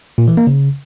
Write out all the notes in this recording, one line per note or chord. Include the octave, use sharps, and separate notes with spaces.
A#2
E3
A#3
C#3